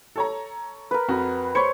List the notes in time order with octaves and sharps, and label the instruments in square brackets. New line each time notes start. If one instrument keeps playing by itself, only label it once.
[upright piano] A4 C#5 A#5
[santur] A#4 B4
[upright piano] F2 F#4
[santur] C5 C#5 [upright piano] B5 G#6 C#7